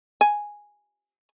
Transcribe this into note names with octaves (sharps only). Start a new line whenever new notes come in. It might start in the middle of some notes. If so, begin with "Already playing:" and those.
G#5